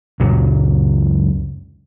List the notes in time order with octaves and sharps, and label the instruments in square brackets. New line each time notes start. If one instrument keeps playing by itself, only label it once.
[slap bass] C#2 F#2 A#2 F#3